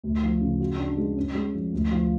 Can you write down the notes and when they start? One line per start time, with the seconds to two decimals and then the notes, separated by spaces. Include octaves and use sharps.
0.03 D2
0.23 F3
0.41 C#3
0.60 F#4
0.78 D4
0.97 G#3
1.17 C#4
1.35 G#3
1.54 F3
1.73 D2
1.91 F3